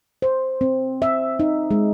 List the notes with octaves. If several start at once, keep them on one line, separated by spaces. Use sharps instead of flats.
C5
C4
E5
D#4
G#3